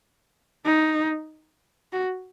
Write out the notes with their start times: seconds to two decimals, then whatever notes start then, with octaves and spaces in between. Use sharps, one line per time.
0.66 D#4
1.93 F#4